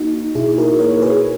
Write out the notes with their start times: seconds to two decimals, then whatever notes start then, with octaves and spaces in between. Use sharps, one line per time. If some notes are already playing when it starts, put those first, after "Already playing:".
Already playing: A#3 D#4 F#4
0.35 B2 E4 G#4
0.58 F#4 A#4
0.80 A#3 A#4 C#5
1.02 G#4 B4